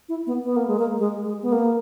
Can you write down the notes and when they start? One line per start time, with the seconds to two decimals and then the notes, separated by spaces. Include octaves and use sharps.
0.09 E4
0.27 B3
0.44 B3
0.56 A#3
0.68 G#3
0.79 A#3
0.98 G#3
1.25 G#3
1.42 B3
1.52 A#3